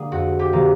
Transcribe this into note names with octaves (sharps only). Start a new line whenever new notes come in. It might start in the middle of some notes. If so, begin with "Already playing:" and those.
Already playing: D3 A#3 G#4
F2 F#4
G4
D3 F3 A#3